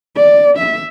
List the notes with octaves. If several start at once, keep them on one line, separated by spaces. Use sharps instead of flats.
D5
E5